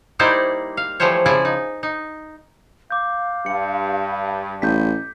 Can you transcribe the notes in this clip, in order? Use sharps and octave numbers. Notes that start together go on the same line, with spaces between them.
G3 A#3 D#4 E4 C5 D5
F5
E3 F3 G3 A3 C5 C#5
C#3 F3 E4 D5 G#5
D#4
D#4
F5 D6 G6
G2 C#7
A1 G6 B6